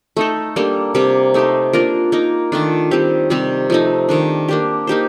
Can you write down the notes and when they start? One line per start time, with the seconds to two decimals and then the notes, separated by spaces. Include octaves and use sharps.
0.17 A3 D#4 A4
0.56 G3 A#3 D4 A4
0.95 C3 G3 A#3
1.34 A3 D#4 G4 C5
1.73 A#3 D4 F4 A#4
2.12 A#3 D#4 A#4
2.52 D#3 A3 D4 F4
2.91 G3 C4 G4
3.30 C3 G3 C4
3.70 F3 A3 D#4
4.09 D#3 G3 D4
4.49 A#3 D4 G4
4.87 A#3 D#4 G4 C5